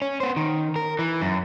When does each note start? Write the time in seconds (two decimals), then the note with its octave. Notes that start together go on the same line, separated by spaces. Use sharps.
0.02 C#4
0.20 B3 C5
0.36 D#3
0.76 A#4
0.99 E3
1.22 F#2